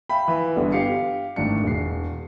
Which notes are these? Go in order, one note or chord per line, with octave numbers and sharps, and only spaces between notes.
E5 F5 G5 B5
E3
G1 D3 G3 B3
G4 F5 C7 C#7
G#1 A2 D4 C#7
E1 C7